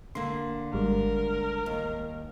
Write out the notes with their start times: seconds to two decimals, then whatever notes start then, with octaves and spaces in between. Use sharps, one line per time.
0.15 D3 A#3 C6
0.73 G#1 G3 G#3 A#4
1.66 D#2